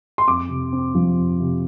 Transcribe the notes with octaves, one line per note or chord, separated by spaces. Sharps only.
C6
F2 D6
C3
C4
F3
F2
C3